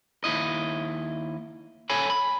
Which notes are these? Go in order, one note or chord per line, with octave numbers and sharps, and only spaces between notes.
D#2 C#3 E4 D#5
A4 C#5 G#5 B5
B5